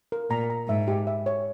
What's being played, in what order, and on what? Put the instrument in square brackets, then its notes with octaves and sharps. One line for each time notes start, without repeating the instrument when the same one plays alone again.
[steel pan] A#4
[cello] A#2 [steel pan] A#5
[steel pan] A#5
[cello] G#2 [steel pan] E5
[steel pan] G4
E5
C#5